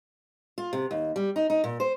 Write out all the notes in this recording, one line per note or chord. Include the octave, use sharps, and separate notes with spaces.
F4
C3
D#2
G3
D#4
D#4
A#2
C5